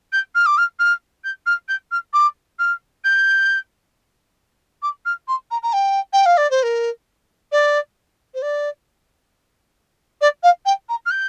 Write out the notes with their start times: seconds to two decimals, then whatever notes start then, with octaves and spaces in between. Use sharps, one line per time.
0.12 G6
0.35 F6
0.46 D6
0.57 F6
0.79 F6
1.24 G6
1.46 F6
1.68 G6
1.91 F6
2.13 D6
2.59 F6
3.04 G6
4.82 D6
5.05 F6
5.27 C6
5.50 A#5
5.62 A#5
5.73 G5
6.12 G5
6.25 F5
6.37 D5
6.50 C5
6.62 A#4
7.52 D5
8.34 C5
8.42 D5
10.21 D5
10.43 F5
10.65 G5
10.89 A#5
11.05 F6
11.10 G6